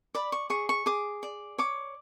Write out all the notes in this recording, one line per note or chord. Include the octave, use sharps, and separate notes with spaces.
D5 B5
C#6
G#4 C#6
C#6
G#4 D6
D5
C#5 D6